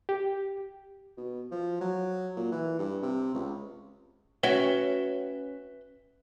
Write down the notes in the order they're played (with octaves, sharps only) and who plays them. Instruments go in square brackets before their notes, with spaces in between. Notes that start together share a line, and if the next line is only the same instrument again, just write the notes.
[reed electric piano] G4
[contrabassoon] B2
F3
F#3
A#2
E3
G2
C3
C#2
[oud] C#4 F#4 [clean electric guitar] B4 E5 G5